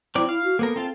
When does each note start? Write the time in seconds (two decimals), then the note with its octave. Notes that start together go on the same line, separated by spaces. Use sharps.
0.15 F#3 C4 E4 D5
0.29 E4 F5
0.44 F#4
0.59 A#3 B3 A4 A#4
0.76 C4 F4 A5